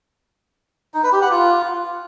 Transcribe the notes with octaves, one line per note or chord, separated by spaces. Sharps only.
D#4
B4
G4
F#5
F4